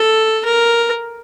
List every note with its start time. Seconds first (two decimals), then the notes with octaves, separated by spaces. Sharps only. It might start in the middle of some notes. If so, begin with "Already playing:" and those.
Already playing: A4
0.45 A#4